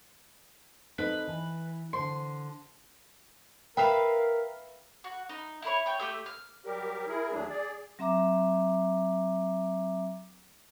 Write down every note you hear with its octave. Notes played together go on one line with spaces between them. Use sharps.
C4 D#4 A4 B4
E3
D3 C5 C6
A#4 B4 E5 F5 G5
F#4
D#4
E4 B4 C#5
C#5 G5
A3 G4 E6
F6
F#3 G3 G4 A#4
E4 G#4 A#4
D#2 F#3 A3 D4 G#4
G#4 D5
F#3 C4 E5 A#5 D6